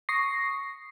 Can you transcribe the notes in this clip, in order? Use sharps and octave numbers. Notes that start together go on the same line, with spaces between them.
C#6 D#6 A#6 C7